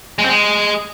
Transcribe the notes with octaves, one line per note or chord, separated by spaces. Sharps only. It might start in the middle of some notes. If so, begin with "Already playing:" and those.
G#3
C4
G#3